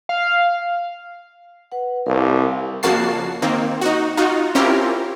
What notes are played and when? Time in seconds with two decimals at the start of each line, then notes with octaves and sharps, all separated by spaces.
0.09 F5
1.72 B4 F#5
2.06 C2 A#4 F5 A5
2.83 F2 C#3 A#3 F#4 A5 C7
3.42 D#3 A#3 C4
3.81 D#4 F#4
4.17 D#4 F4 F#4
4.55 C4 C#4 E4 F4 G4 A#4